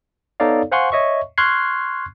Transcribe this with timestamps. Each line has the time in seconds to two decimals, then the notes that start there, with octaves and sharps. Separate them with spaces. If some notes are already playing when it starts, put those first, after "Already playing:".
0.40 B3 D#4 A4 C#5 D5 F5
0.72 C5 F5 F#5 G#5 C6 C#6
0.92 C#5 D#5 E5 C#6
1.38 C6 C#6 F6 F#6 G#6 C7